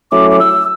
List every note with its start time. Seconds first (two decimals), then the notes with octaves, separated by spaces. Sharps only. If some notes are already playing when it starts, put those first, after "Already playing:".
0.12 F#3 A3 C#4 E4 D6
0.31 D6
0.39 E6